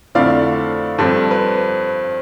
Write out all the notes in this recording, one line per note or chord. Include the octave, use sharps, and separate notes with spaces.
F2 D3 A3 E4 D5 F5
G2 F3 C4 A4
B4